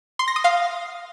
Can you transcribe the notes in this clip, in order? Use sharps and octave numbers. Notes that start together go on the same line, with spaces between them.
C6
A#6
D#6
F5